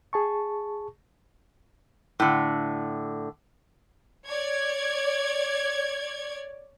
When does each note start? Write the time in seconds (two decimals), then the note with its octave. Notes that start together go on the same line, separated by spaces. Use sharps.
0.13 G#4 A5 C#6
2.20 A2 D3
4.26 C#5 D5 G#6